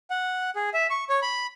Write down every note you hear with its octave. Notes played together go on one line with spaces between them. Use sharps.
F#5
G#4
E5
C#6
C#5
B5